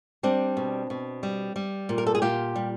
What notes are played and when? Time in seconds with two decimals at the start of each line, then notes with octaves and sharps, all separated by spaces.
0.23 G3 C4 D4
0.57 B2
0.90 B2
1.23 G3
1.56 G3
1.89 A#2
1.98 A#4
2.07 A4
2.15 G#4
2.22 A#2 F4 G4
2.56 G3